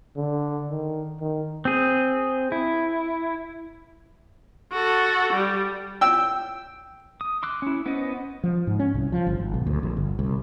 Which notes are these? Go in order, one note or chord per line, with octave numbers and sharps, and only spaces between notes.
D3
D#3
D#3
C4 G#4
E4
F#4 A4
G3
G5 E6
D#6
C6 D6 E6 F#6
C#4 E4
B3 C#4 B4 C5 D#5
F3
G#2
C#4
C2
F3
G1
G#1
B1
D2
A#1
G1
C2